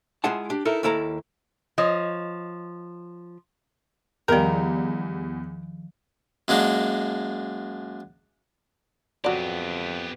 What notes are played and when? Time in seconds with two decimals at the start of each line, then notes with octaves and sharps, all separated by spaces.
0.24 G#3 E4 F4 G#4 F#5 A5
0.50 D4 G4
0.65 D#4 E4 A4 A#4
0.83 D#2 A#3 E4 A4 A#5
1.78 F3 C#5 D#5
4.28 E2 D#3 F3 G3 G4 A#4
6.48 F#2 G#3 A#3 D4
9.24 F2 F#3 B3 G4 D5